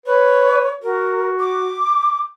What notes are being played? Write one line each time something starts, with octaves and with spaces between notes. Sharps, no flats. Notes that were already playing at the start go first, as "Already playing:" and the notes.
B4 C#5
F#4 A#4
D6